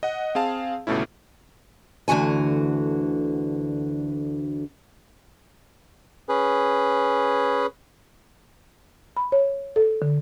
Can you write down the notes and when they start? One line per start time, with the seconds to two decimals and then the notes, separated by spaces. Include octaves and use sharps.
0.03 D#5 F#5
0.35 C4 G#4 F5 A5
0.87 G1 C#2 B2 A3 C#4 E4
2.08 D2 D3 E3 F#4 G#5
6.29 C#4 G#4 B4
9.17 B5
9.32 C#5
9.76 A4
10.02 D3